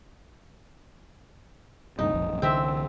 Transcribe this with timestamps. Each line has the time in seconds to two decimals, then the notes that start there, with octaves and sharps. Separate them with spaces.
1.99 D2 G2 C3 D#4
2.14 F1 A#1 F2
2.30 A#1 F#2
2.42 C2 D3 E3 C4 E5